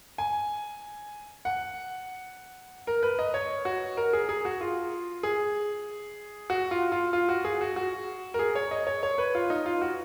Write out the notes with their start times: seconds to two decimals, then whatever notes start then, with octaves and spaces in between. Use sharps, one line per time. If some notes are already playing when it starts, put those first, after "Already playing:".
0.18 G#5
1.45 F#5
2.87 A#4
3.03 B4
3.19 D#5
3.34 C#5
3.65 F#4
3.97 A#4
4.13 G#4
4.29 G#4
4.45 F#4
4.61 F4
5.23 G#4
6.50 F#4
6.71 F4
6.92 F4
7.13 F4
7.29 F#4
7.44 G#4
7.61 F#4
7.76 F#4
8.34 A#4
8.39 G#4
8.55 C#5
8.71 D#5
8.87 C#5
9.03 C#5
9.18 B4
9.35 F4
9.50 D#4
9.66 F4
9.81 F#4